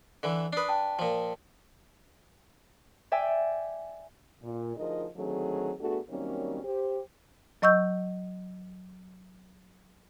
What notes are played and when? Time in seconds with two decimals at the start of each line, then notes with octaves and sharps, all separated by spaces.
0.23 D3 E3
0.53 D4 B4 D#6 C7
0.69 G5 A5
0.99 A#2 F3
3.12 D5 E5 G5 G#5
4.43 A#2
4.76 D2 F3 D#4 G#4 A#4 D#5
5.16 D3 D#3 F#3 A3 C4 G#4
5.79 A3 B3 D4 F#4 G#4 A4
6.09 D#3 F#3 G3 A#3 C4 C#4
6.64 G4 C5
7.62 F#3 D#5 C#6 E6 G6